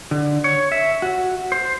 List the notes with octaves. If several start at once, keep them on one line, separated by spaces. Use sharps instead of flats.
D3
C#5
E5
F#4
C5